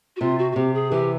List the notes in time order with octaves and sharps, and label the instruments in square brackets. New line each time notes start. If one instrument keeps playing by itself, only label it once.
[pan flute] F#4
[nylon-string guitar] C3 [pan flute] F4
[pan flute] F#4
F#4
[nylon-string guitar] C3 [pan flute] G4
[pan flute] G#4
[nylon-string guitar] E3 [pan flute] G4